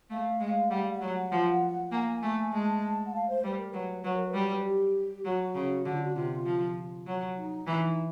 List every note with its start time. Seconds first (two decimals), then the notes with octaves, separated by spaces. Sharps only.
0.10 A3 F5
0.40 G#3
0.70 G3 F#5
0.81 F5
0.92 F#5
1.01 F#3
1.31 F3
1.91 A#3 G#5
2.22 A3
2.52 G#3 A5
3.07 F#5
3.13 F5
3.28 C5
3.44 G3 B4
3.57 A#4
3.70 F#3 B4
4.03 F#3 B4
4.16 A#4
4.28 B4
4.34 G3
4.65 G4
5.25 F#3 F#4
5.55 C#3
5.85 D3 F#4
5.93 F4
6.01 F#4
6.15 C3 F4
6.45 F3
7.06 F#3
7.36 D#4
7.67 E3